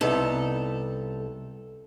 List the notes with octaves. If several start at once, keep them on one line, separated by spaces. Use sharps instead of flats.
C2 B3 D#4 A4